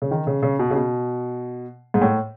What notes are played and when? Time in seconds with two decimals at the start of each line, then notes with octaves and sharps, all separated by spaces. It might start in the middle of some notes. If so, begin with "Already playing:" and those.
0.02 C#3
0.11 D#3
0.27 C#3
0.43 C#3
0.59 B2
0.70 C#3
0.75 B2
1.94 G#2
2.01 A2